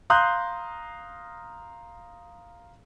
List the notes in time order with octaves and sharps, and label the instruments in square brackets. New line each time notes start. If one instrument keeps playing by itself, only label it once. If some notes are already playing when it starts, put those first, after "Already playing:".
[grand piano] F5 A#5 C6 D#6 F#6 G6